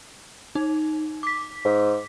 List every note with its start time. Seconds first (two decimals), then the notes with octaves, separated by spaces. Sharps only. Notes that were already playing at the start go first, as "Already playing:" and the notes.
0.55 D#4
1.23 D6 B6
1.65 G#2